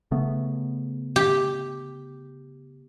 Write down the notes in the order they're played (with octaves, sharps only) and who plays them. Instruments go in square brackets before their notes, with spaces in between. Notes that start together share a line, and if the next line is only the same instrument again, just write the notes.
[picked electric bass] C#3 A3 B3
[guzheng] G4